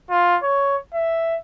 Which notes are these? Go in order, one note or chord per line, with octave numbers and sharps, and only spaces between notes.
F4
C#5
E5